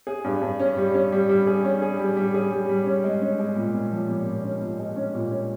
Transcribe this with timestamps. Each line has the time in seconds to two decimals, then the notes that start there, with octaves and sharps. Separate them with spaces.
0.07 G#4
0.24 G2
0.42 G2
0.59 C#4
0.77 G3
0.94 C#4
1.12 G3
1.29 G3
1.47 G#4
1.64 C#4
1.82 G#4
1.99 G3
2.17 G3
2.34 G#4
2.51 G3
2.69 G3
2.86 C#4
3.04 G#3
3.22 C#4
3.39 G#3
3.56 A#2
3.74 A#2
3.91 F3
4.09 A#2
4.26 A#2
4.44 C#4
4.61 A#2
4.79 G#3
4.96 C#4
5.14 A#2
5.31 C#4